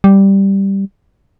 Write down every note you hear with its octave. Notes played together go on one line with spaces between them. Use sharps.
G3